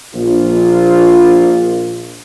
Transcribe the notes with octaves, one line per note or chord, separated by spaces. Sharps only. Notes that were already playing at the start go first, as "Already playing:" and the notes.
A#1 F4